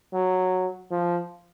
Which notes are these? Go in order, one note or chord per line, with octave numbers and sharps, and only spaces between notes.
F#3
F3